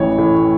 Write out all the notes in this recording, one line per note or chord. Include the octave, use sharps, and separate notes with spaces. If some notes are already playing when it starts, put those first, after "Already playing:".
Already playing: A1 E3 C#5
A2